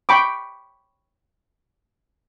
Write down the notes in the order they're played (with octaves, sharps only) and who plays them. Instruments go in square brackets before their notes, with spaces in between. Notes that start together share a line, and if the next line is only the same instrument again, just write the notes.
[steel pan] G5 B5 C#6 D6